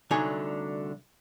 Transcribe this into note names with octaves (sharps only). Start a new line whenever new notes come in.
C2 D3 F#3 A3 D#4 G#5